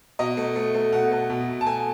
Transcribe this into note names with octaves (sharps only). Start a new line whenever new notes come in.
B2 D#5
A3
A3
A3
B2 F#5
A3
B2
B2
A5
A3 G#5